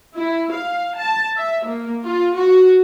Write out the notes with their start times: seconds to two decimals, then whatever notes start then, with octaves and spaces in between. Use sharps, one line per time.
0.16 E4
0.52 F5
0.97 A5
1.37 E5
1.66 A#3
2.03 F4
2.36 F#4